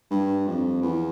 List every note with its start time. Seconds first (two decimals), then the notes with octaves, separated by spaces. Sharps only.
0.11 G2
0.47 F2
0.82 E2